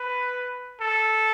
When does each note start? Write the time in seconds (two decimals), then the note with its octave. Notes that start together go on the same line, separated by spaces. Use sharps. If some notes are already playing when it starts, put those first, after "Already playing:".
Already playing: B4
0.81 A4